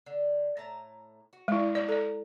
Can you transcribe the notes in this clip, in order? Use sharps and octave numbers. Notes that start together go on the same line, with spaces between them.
D3
A2 A5 A#5
F#4
G#3 E4 D5
F#3 G3 B3 D5
A4 D5 A#5